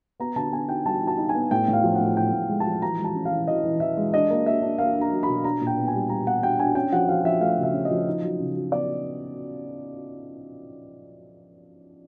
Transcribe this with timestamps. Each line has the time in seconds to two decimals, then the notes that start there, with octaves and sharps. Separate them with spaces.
0.20 B3 A#5
0.36 D3 A5
0.52 B3 G#5
0.69 D#4 G5
0.86 G3 A5
1.02 D#4
1.07 A5
1.18 D#4
1.29 G#5
1.35 B3
1.51 A2 G5
1.68 A2
1.73 F5
1.83 F3
1.95 F#5
2.01 A2
2.17 A2 G5
2.33 A2
2.49 G#3
2.60 A5
2.66 F3
2.82 E3 A#5
2.98 G#3
3.04 A5
3.15 C#4
3.25 F5
3.31 E3
3.48 E3 D#5
3.64 E3
3.80 E3 E5
3.97 G#3
4.13 D4 D#5
4.30 A#3
4.46 A#3 E5
4.62 D4
4.78 A#3 F5
4.95 D4
5.01 A#5
5.11 F#3
5.23 B2 B5
5.44 D4 A#5
5.61 A#2
5.67 G5
5.77 B3
5.88 G#5
5.94 G3
6.09 G3 A#5
6.27 B3 F#5
6.43 D4 G5
6.59 D4 G#5
6.75 C#4 G5
6.92 F3 F#5
7.08 F3 F5
7.24 F3 E5
7.41 A3 F5
7.58 C#3
7.63 E5
7.73 C#4
7.85 D#5
7.91 F3
8.07 D#4
8.23 F#3
8.40 C#3
8.55 F#3
8.72 B3 D5